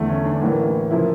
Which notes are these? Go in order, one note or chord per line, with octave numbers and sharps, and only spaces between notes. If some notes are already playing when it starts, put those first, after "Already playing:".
Already playing: E2 D3 A3
C#4
D4
A1 A2 E3 A#3
C#3 F3 A#3 E4